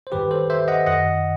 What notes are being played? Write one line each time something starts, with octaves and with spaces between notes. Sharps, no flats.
C5
G2 D#3 G4 B4
A4 C5
C5 E5
D#5 F#5
F#2 D#3 D#5 F#5